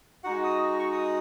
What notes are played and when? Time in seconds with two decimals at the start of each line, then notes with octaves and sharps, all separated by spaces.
0.24 G#3 D#4 F#4 F#5
0.44 D#6
0.79 C#6
0.92 D#6